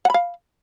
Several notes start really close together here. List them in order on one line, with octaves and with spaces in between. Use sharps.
F#5 B5 F5